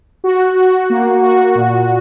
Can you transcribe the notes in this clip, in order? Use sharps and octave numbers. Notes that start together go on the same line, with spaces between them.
F#4
F#4
A#3
F#4
A#2